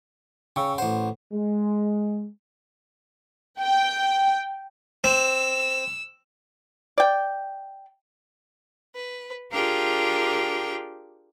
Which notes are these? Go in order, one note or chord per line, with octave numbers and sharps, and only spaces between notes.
C#3 G5 C#6 E6
A1 C5 F#5
G#3
G5
C4 E6
D5 G5
B4
D4 F4 G4 G#4 A#4 G5